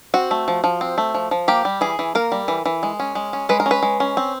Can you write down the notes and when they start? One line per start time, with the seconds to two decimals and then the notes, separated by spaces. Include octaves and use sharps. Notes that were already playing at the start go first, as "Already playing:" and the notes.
0.14 C4 F#4
0.31 A3
0.48 F3
0.64 F3
0.81 C4
0.98 A3
1.14 F3
1.31 F3
1.48 A#3 G4
1.65 G3
1.81 E3 G#4
1.99 E3
2.15 A#3 A#4
2.32 G3
2.48 E3
2.66 E3
2.83 G#3
3.00 C#4
3.15 G#3
3.33 C#4
3.49 G#3 B4
3.60 A#4
3.66 C#4
3.71 B4
3.83 G#3
4.00 C#4
4.17 C4